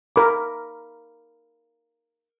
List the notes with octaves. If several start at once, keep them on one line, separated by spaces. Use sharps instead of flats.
A#4 B5 D6